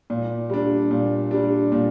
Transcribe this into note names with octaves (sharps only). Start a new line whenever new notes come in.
A#2
G3 D4
A#2
G3 D4
A#2